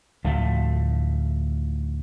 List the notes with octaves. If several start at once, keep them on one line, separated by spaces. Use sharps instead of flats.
D2 A2 F3 A3